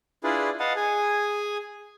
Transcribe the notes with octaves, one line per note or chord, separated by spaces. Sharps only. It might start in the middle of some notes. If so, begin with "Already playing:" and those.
D4 E4 F4 G#4 B4 D5
B4 D#5 F5 F#5 A5
G#4 G#5